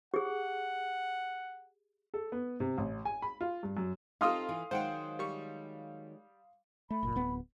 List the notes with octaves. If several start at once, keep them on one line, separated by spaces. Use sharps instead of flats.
G4 G#4 F#5
A4
B3
C3
A1
G#5
B5
F4
G2
F#2
C4 D#4 F4 G4 A4 F5 C6 D#6
E3
D#3 F#3 G#3 C5 F#5 G5
G3 C#6
A3 B5
F#1 A#2
D1 B3